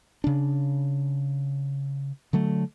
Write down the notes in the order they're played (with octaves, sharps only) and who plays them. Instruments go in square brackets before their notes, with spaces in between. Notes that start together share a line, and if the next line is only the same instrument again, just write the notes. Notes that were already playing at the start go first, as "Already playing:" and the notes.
[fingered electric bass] C#3 D4
D3 F#3 A3